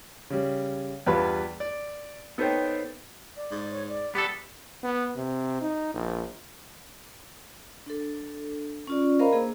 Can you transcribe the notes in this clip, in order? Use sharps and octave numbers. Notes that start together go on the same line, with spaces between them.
C#3 G3
E2 G2 G3 F4 B4 B5
D5
B3 D#4 A4 C5 C#5 G5
D5
G#2
C#5
D5
G3 B3 A4
B3
C3
D#4
A#1
D4 A4
C#4 F4 D5
A#4 C5 D#5 F5 A#5 B5
A#3 D4 G#4 A#5